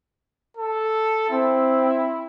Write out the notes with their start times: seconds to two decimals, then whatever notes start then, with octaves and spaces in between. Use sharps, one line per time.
0.57 A4
1.30 C4 E4